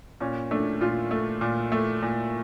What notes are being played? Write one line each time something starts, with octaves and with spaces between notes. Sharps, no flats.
A#2 C#4
A3 D4
A#2 F4
A3
A#2
A3
A#2